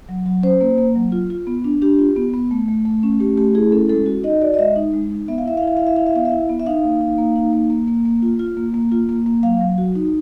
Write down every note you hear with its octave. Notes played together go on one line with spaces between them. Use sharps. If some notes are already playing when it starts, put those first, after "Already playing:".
F#3
F#3
C#4 C5
A#3
A#3
F#3
F4
F4
B3
D4
D4 G4
F4
B3
B3
A3
A3
A3
C#4
A3 G4
A3 G4
E4 G#4
C#4 A4
G#3 A4
F#4
D#4 D#5
F#4 D5
D#5
G#3 E5
D#4
G#3
D#4
B3 E5
F5
E4 E5
F5
E4 E5
E4 F5
E5
E4 F5
E5
B3 F5
E5
E4
B3
E5
D#4 F5
A#3
D#4
A#3
D#4
A#3
A#3
A#3
A#3
F4
F4
A#3
A#3
F4
A#3
A#3
F#3 F5
F#3
F#4
D#4